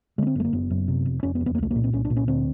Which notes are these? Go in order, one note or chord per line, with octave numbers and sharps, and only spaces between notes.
D3 G#3 B3
C4
F#1 A3 B3
A#3
F#1 B3
F#2
C3
F1
F1 C#4
B3
E2
B3
A#3
C2 A3
A#3
A#2
C4
C2 C#4
D4
A#2
C#4
D2 C4